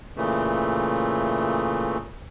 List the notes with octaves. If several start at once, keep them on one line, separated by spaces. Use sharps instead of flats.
A#2 C#3 E3 A3